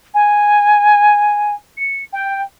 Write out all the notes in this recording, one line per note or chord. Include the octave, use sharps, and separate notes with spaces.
G#5
C#7
G5